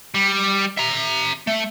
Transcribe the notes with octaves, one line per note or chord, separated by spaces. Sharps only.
G3
E5 A#5
A3